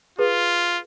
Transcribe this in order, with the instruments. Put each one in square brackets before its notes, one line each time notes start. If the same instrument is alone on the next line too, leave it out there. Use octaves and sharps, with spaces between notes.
[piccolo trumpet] F4 [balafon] G#4 B4